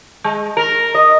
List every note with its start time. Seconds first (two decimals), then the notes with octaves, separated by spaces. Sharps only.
0.24 G#3
0.57 A#4
0.95 D#5